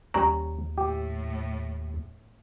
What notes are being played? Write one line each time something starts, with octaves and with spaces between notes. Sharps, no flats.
D#2 G3 C#4 C#5 A#5
A2 G4